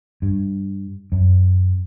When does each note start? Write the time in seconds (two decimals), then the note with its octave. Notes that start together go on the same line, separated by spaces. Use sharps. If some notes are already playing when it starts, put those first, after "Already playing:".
0.22 G2
1.12 F#2